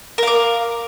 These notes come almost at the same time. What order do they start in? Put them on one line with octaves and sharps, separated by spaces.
A#4 F5 D6